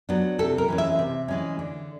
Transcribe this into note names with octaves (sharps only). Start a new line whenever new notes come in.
F#3 B3 D4
C3 A4
A#4
E3 G#3 C#4
E5
C3
E3 G#3 C#4
D3